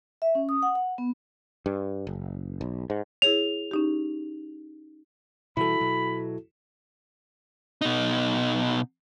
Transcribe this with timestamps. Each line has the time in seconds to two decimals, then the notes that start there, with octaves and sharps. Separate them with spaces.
0.22 E5
0.35 C#4
0.49 D#6
0.63 F#5
0.75 F#5
0.98 B3
1.66 G2
2.07 F#1
2.61 B1
2.90 G#2
3.22 E4 G#4 C#5 F7
3.71 C#4 D#4 G4
5.57 B2 E3 G3 E4 F#4 A4 B5
5.80 B2 F#3
7.82 B2 D#4